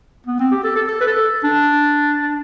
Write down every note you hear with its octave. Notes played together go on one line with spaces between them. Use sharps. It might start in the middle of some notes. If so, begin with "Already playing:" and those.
B3
C4
G4
A4
A4
A4
B4
A4
D4